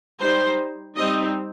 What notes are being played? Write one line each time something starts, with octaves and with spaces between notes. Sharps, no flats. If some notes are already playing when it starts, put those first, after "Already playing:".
G3 D#4 C5
G3 C4 D#4 D#5